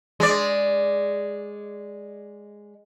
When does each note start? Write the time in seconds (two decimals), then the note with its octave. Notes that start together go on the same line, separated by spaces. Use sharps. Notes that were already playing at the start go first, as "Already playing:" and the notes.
0.20 G#3 D5